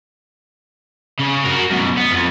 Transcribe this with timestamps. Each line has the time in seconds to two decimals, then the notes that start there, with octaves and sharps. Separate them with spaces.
1.20 C#3
1.45 F#4 A#4
1.71 F#2 B2
1.97 B3
2.11 F2